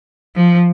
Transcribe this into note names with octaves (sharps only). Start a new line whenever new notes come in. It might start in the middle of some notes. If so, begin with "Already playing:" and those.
F3